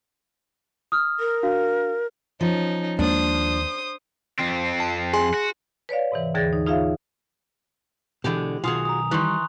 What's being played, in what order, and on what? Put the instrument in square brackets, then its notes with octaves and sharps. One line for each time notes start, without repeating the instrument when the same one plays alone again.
[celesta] D#6 F6
[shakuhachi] A#4
[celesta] D4 F#4 F5
[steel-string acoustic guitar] F3 [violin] C#4 D#4
[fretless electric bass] D#2 G#3 A#3 [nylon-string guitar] D4 [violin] C5 D#6
[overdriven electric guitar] F2 C4
[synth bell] A5
G#4 G#5 C6
[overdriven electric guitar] F#4
[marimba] B4 C#5 D5 F5
G#2 C3 E3
D#2 D3 E3 G#4 A6 A#6
D#4
D#4 F4 G#4 C#5 E5 F5
[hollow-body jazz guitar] B2 D3 [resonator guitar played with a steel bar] E3 G#3 G4
[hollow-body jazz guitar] B1 D#3 [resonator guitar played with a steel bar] F4 F#4 G#4 [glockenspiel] G#5 D#6 F7
[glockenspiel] A#5 D#6
[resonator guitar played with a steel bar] D#3 E3 [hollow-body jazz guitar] G3 [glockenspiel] C6 C#6 F#6